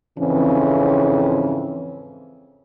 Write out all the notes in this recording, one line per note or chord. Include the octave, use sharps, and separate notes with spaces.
F2 G#2 C#3 E3 C4 C#4